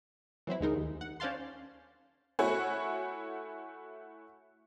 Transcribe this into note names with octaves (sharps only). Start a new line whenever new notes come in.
E3 F#3 C4 E4
D2 E3 G#3 D#4 A#4
D#2
F#5
C#4 C5 D5 F5 A5 C6
A3 E4 F#4 C#5 G#5